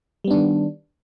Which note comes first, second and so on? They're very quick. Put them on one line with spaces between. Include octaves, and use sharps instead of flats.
G3 B3 D4 D#3